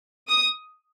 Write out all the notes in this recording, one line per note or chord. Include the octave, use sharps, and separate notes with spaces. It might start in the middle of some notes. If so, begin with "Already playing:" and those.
D#6